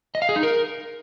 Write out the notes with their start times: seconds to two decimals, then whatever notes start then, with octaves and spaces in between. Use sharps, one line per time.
0.15 D#5
0.22 F5
0.29 G#4
0.36 D#4
0.43 A#4